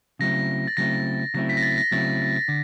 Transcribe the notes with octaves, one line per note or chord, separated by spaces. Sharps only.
C#3 F#3 A3 C4 E4 A#6
A6
C#3 F#3 A3 C4 E4 A#6
C#3 F#3 A3 C4 E4 A#6
B6
A#6
A6
A#6
C#3 F#3 A3 C4 E4 A6
D3